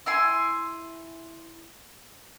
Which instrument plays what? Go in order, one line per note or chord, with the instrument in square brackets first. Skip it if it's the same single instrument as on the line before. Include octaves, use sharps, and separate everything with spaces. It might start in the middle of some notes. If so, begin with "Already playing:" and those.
[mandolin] E4 G#5 C6